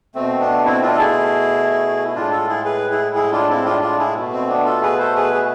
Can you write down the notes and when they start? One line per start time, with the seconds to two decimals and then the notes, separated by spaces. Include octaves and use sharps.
0.15 B2 A3 C4
0.40 B3 D4
0.65 C4 E4
0.81 D4 F4
0.94 A4
0.98 E4 G#4
2.15 A2 G#3 D4 F4
2.32 F4 A4
2.49 E4 G#4
2.65 G#4 B4
2.90 E4 G#4
3.15 E4 G#4
3.32 D4 F4
3.49 C4 E4
3.65 D4 F4
3.82 D4 F4
3.99 E4 G#4
4.15 B2 A3
4.33 C4
4.48 B3 D4
4.65 F4 A4
4.82 G#4 B4
4.99 A4 C5
5.15 G#4 B4
5.33 G#4